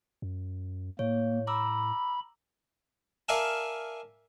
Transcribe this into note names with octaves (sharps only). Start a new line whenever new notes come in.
F#2
A2 A#3 C#5
A#5 B5 D6 E6
A#4 D5 E5 F5 G#5 A5